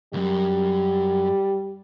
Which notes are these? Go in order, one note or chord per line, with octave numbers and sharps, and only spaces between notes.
C2 F#2 G3